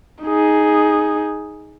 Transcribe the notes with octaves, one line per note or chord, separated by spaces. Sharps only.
D#4 G#4